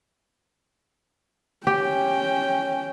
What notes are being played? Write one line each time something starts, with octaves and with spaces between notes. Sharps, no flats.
C#4 G4 G5